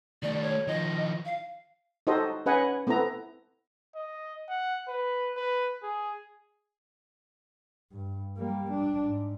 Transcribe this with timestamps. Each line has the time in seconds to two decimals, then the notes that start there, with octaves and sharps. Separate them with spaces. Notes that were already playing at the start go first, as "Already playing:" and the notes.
0.23 D#3 A3 D5
0.42 C#5
0.67 D#3 F3 D#5
1.25 F5
2.07 D#4 F#4 G4 A4 C5 D#5
2.46 C#4 G#4 B4 D#5 F#5 G#5
2.87 A3 B3 C4 E4 A#5
3.95 D#5
4.49 F#5
4.88 B4
5.37 B4
5.83 G#4
7.92 G2
8.37 G3 A#3
8.71 D4
9.06 G#2